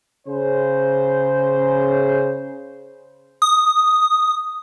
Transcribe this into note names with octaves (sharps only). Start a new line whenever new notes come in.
C#3 C5
D#6